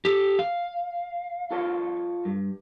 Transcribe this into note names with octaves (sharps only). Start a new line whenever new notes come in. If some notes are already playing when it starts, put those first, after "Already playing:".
G4 A4
F5
F4 A4 C#5
G2